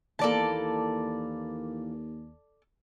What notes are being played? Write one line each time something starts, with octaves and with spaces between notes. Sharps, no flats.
D#2 E3 A#3 A4 D5 A5